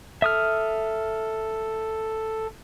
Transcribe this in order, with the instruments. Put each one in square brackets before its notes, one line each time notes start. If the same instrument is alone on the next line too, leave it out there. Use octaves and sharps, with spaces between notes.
[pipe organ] A4 [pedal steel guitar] E5 D#6 F6